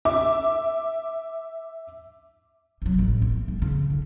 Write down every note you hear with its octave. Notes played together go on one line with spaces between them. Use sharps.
E5 D6
C3 F#3
A1
A#3
G#3
C#3
D3